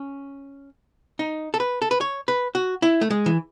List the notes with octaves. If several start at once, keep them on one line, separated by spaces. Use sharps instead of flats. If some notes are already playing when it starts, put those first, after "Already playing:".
Already playing: C#4
D#4
A4
B4
A4
B4
C#5
B4
F#4
E4
A3
G#3
E3